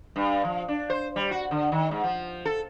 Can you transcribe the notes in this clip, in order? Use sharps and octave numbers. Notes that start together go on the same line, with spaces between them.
G2
F3
D4
C5
G3
F#4
D3
D#3
G#2
F3
A4